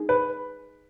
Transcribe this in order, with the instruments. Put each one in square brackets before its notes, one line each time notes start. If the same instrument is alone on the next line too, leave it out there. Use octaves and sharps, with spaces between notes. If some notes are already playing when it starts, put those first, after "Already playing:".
Already playing: [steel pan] D#4 G#4
[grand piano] B4